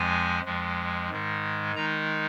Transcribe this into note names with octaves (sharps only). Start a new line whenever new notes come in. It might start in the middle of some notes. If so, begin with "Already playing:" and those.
Already playing: F2 F3 G#3 G#5
F2 F3 G#3
G#2 D#3 G#3
D#3 G#3 D#4 A#5